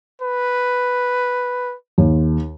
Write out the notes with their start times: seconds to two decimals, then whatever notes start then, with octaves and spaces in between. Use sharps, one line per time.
0.22 B4
1.98 D#2